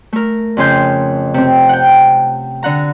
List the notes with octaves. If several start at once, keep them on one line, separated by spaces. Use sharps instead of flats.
A3 A#4
F2 C#3 C6 G6
C3 C4
F#5 G5
D3 F#5 A#5